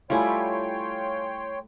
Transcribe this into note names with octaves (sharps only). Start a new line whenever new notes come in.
G3 A3 E4 F4 C#5 G5 G#5 C6